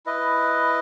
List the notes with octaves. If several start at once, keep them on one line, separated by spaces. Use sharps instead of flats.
E4 B4 D#5